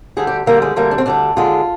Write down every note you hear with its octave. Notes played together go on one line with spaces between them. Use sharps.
D2 D3 G3 G#4
G4
D2 D3 G3 A#3
G#3
D2 D3 G3 A#3
D4
C4
D2 D3 G3 D4
D#2 D3 G#3 F4